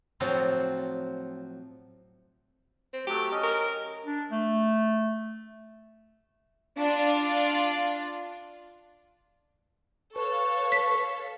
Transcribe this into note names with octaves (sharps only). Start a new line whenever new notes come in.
A2 F3 F#3 C4 F#4 F5
C4
F#3 A3 G4
C#4 D#5
A#4
D4
A3
D4 F4
A4 B4 C#5 F5 C#6
B6